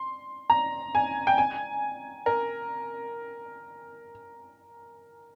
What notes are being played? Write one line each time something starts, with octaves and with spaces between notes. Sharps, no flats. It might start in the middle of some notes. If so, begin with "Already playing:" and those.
Already playing: C6
A#5
G#5
G5
G#5
A#4